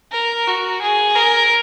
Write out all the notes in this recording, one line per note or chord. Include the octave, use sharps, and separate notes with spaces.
A#4
F#4
G#4
A#4